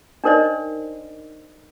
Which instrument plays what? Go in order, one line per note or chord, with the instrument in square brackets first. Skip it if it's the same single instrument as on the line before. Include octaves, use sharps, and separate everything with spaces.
[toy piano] D4 D#4 A#4 C5 D5 D#5